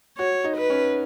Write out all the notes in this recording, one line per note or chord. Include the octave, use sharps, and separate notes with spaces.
F#4 C#5
D#4
B4
C#4